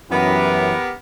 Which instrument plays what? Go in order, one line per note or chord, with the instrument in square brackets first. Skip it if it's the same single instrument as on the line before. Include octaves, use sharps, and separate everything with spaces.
[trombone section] F#2 E3 [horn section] B3 G4 A#4